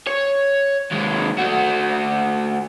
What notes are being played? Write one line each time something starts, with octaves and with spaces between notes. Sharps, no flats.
C#5
D#2 G#3
A3 F#4